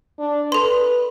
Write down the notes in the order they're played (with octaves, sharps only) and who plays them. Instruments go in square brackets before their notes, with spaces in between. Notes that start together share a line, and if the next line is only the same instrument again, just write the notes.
[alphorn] D4
[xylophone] A4 C6 [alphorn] B4